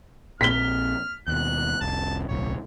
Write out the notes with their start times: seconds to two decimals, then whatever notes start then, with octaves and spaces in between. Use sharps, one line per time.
0.41 A#1 A#2 C4 F6 B6 G7
1.28 D#2 B2 F#6
1.81 F1 C2 A5
2.29 D1 B1 A2 C#5